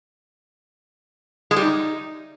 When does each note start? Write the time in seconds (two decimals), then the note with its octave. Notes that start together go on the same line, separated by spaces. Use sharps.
1.51 G#3
1.56 G3
1.62 D#4